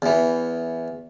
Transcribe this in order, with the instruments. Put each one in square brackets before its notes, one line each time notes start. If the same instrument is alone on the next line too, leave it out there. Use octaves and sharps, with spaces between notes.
[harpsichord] E2 E3